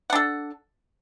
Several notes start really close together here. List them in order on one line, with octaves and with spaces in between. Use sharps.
F#5 D4 A4